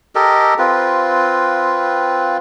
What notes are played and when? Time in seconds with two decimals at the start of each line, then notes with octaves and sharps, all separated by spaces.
0.15 G4 A4 A#4 D#5
0.59 C4 F4 B4